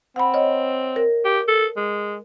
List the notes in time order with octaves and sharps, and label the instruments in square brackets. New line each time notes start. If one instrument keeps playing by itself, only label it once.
[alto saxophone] C4 [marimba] F#5 B5
[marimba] C#5 D#5
A#4
[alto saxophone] G4
A4
G#3